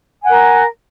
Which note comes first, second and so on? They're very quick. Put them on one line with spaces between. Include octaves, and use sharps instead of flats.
G#5 F#5 A#4